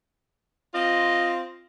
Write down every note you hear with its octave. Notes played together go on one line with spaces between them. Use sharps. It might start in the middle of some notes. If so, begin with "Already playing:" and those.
C4 F4 D#5